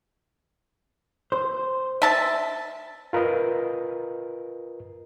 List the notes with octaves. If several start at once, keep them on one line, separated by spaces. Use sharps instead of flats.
C5
E5 A5
F4 A#4 B4 D#5